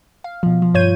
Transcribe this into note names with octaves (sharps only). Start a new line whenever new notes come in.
F5
B2 F3
F3
G2 F4 C#5 G6 G#6 D#7